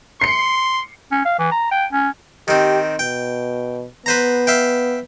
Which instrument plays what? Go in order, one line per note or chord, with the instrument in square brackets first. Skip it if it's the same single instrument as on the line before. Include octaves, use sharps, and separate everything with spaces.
[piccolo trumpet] C6 [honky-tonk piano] C7 C#7
[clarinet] C#4
F5
E3
A#5
G5
C#4
[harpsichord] D#3 C4 [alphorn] G4
[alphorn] B2 [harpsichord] G5
[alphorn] B3 [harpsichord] B4 C5 A#5
[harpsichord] E5 F5 G5